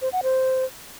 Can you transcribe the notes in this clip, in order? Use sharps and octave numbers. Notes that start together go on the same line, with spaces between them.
C5
F#5
C5